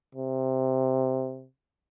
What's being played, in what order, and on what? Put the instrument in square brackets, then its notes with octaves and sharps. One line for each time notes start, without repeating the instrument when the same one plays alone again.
[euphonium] C3